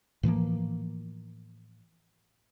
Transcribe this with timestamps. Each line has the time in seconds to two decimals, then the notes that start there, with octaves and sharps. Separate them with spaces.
0.23 A2 E3 F3 A#3